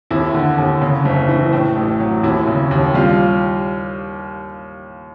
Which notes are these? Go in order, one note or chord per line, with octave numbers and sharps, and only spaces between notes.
D#2 E4
D3
D#2
C#3
F#1
E3
A2
A1
F#3
D#2 E4
C#3
D#2
G3 F4